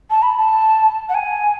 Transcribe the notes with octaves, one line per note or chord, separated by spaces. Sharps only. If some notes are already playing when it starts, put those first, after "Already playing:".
A5
B5
A5
F#5
G#5